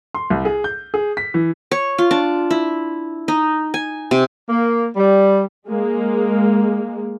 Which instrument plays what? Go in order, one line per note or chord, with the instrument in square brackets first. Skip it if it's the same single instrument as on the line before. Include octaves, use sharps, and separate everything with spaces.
[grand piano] C6
C2
G#4
G6
G#4
B6
E3
[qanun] C#5
F4
D4
E4
D#4
G#5
C3
[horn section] A#3
G3
[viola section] G#3 A#3